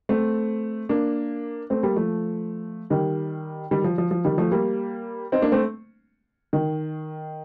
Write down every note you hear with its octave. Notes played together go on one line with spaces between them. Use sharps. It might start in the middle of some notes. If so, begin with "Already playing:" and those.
A3 C4
A#3 D4
A3 C4
G3 A#3
F3 A3
D#3 G3
D#3 G3
F3
F3
F3
D#3 G3
F3 A3
G3 A#3
C4 D#4
A#3 D4
A3 C4
D#3